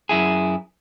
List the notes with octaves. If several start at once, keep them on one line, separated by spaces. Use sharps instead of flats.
F#2 E4 G#4